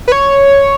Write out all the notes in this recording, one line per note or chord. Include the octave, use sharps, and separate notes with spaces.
B4
C#5